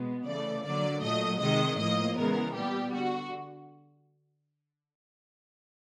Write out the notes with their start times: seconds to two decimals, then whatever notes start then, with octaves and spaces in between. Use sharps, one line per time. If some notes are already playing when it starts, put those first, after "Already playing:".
Already playing: B2 G#3 B3
0.26 C#3 E3 A3 D5
0.65 D3 F#3 A#3 D5
1.02 A#2 F#3 A3 D#5
1.41 C3 D#3 G#3 D#5
1.79 A2 F3 A#3 D#5
2.18 C#3 E3 G#3 B3 A#4
2.56 A#2 G3 B3 G4
2.94 D3 F#4